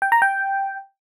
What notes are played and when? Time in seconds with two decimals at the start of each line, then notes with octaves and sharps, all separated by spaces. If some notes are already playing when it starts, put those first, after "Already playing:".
0.02 G5
0.12 A#5
0.22 G5